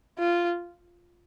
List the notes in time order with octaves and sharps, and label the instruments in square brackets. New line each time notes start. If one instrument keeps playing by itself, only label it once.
[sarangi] F4